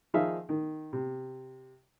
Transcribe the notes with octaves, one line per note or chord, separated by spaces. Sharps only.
D#3 F3 D#4 G#4 E5 F5
D#3
C3